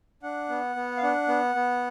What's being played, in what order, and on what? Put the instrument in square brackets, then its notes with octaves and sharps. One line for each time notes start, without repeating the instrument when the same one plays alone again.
[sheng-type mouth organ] D4 F#5
B3
B3
F5
D4 F#5
B3
B3